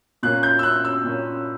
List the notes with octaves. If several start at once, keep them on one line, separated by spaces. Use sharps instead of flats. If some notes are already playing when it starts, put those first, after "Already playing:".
A#2 A#3 C#4 F#6
G6
E6
F#6
E6
A#2 A#3 C#4